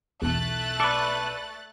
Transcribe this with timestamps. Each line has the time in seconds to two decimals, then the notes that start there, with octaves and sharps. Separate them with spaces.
0.22 B1 E2 A3 E4 F#6 A6
0.80 A4 B4 D5 C#6